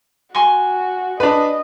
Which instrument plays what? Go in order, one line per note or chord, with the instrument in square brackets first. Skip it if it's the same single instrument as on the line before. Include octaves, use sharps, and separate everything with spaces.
[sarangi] F#4 [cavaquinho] G#5 C6 C#6
[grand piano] D4 B4 [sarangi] D#5